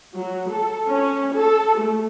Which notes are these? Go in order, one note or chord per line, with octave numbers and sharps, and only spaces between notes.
F#3
A4
C#4
A4
A3